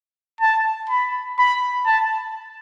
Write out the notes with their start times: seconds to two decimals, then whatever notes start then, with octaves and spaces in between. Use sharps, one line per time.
0.41 A5
0.90 B5
1.39 B5
1.86 A5